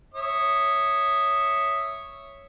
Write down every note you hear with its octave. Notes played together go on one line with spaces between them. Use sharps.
C#5 E5 D#6